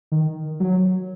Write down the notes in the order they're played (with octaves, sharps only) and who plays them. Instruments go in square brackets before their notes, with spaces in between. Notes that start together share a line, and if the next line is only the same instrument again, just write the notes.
[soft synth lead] D#3
F#3